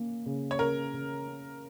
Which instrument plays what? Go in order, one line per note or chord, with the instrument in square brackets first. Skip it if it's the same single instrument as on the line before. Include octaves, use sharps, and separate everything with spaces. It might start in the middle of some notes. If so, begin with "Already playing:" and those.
Already playing: [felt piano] A#3 C#4
C#3
[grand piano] C#5
[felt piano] C#3 [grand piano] A#4
[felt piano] C#3
C#4